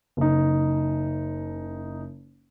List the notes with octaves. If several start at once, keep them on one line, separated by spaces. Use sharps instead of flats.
F#1 D#4